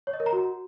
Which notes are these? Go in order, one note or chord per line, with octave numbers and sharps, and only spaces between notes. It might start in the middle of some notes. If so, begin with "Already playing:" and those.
C#5
D#5
A#4
A#5
F#4